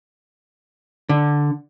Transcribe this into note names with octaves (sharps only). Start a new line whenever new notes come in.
D3